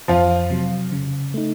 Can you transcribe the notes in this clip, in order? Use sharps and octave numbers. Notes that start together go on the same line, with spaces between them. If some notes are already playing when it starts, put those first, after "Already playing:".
F2 F3 F4
C3 F#3
C#3
A3 D#4